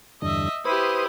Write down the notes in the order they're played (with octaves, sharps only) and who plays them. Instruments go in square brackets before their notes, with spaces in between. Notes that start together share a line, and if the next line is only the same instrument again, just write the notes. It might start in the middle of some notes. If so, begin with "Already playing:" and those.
[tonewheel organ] E2 G2 D3 [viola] D#5 E5
[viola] E4 G4 [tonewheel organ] B4 C5 D#6